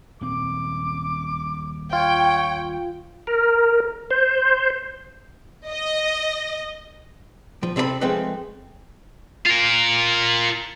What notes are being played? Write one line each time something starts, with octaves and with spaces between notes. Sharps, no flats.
D#1 C4 D6
F4 C#5 G5
A#4
C5
D#5
F3
C3 C4 A4 D5 B5
F3 G#3 A3 C4 D#4 B4
F4 A#4